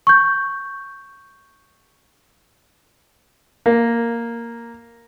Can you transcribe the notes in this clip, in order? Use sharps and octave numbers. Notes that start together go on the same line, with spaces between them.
C#6 G6
A#3